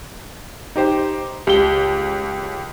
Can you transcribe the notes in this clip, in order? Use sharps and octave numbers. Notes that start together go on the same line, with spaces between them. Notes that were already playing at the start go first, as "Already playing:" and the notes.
D#4 G4 C5
C#2 G4 G7